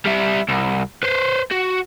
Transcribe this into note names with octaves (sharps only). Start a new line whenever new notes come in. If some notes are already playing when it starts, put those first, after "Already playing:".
G3 E4
C2
B4 C5
F#4